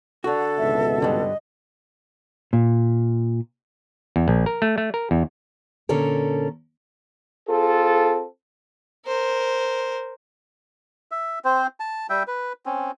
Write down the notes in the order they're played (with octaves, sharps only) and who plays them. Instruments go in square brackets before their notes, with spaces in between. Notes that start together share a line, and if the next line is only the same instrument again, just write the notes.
[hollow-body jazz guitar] D3 F#4 [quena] A4
[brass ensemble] G#1 C#2 B2 [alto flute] E5
[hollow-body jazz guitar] G2 D3 [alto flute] D#5
[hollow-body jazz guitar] A#2
[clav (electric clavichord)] E2
A#1
A#4
A3
A3
A#4
E2
[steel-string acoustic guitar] A#2 D3 C#4 A4 A#4
[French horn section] C4 F4 G#4 A4
[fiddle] A#4 C5
[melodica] E5
C4 C5
A5
G3 E5 G5
B4
C4 C#4